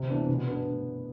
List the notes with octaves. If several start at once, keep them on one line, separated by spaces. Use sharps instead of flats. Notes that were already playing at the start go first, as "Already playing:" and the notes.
Already playing: C3
E3 B3 D4
B2
B3 D4